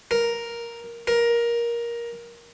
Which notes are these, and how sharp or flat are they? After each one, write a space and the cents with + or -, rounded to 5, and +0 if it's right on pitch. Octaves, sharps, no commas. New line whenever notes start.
A#4 +5
A#4 +15